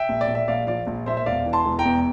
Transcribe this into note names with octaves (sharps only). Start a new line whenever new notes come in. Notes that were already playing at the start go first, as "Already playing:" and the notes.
Already playing: E5 G5
A#1
D5
A#2
E5
A#1 D5 F5
F3 D5 F5
A#1
A#2 C5 E5
E5
E1 D5 F5
E3
A5 C6
E1
G5 A#5
E2